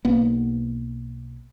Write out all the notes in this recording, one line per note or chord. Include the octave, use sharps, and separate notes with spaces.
B1 A#3 B3